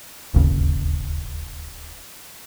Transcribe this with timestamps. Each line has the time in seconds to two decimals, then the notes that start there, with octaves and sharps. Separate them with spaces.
0.34 D1 G1 D#2 C#3